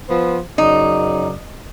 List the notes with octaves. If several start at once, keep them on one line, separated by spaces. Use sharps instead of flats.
F3 B3 C5
F#2 C#3 D#4 D5